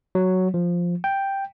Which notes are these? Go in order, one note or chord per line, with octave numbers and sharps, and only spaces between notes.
F#3
F3
G5